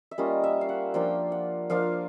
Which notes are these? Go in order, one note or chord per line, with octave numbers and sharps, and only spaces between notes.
E5
G3 A#3 C#4 F4 D#5
E5
F5
F#5
F3 A#3 D4 F4 G5
F#5
F3 A#3 D4 F4 F5